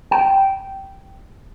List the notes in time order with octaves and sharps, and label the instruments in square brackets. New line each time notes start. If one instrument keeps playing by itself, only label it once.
[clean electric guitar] G5